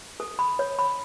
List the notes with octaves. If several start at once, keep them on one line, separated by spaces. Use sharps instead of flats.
A4
B5
C#5
B5